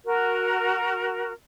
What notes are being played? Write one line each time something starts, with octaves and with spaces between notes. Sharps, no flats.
F#4 A#4